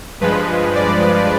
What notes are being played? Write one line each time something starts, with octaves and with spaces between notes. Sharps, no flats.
G2 F3 G#3 B4
D5